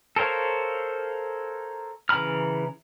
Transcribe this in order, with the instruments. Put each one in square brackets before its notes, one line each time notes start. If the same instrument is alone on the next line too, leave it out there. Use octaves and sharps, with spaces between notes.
[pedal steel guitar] A4 A#4 C5 C#5 F5
C#3 E3 A#5 B5 F6